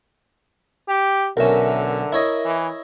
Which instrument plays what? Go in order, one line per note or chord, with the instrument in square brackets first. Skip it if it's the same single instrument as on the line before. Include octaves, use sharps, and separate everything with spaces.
[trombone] G4
[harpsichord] B1 C#4 [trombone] D3 [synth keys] A#4 E5
[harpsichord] E4 C#5 D#5
[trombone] E3